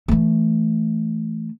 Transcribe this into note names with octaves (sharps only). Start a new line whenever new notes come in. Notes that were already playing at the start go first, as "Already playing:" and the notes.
E3 A3